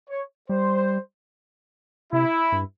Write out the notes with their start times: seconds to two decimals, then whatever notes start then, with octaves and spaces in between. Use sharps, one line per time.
0.10 C#5
0.49 G3 C5
2.12 C3 E4
2.52 G2